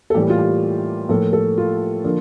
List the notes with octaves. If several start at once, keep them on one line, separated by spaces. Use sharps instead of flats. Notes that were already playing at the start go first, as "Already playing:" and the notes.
A4
A2 E3 G3 A#3 G4
F4
G4
A2 F3 A#3 A4
A4
F4
D3 F3 A#3